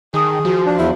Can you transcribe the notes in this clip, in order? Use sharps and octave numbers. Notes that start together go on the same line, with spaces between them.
D#3 G#4 C#5 A5 D#6
F3 F#4
D4
E2 E4